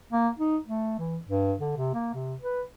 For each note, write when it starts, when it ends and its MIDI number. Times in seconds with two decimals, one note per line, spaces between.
0.13 0.29 58
0.38 0.58 63
0.68 0.97 57
0.99 1.18 52
1.28 1.53 43
1.60 1.74 50
1.77 1.92 48
1.94 2.09 58
2.14 2.35 48
2.41 2.62 71